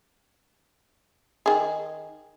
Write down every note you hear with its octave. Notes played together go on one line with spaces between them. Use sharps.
D#3 G#4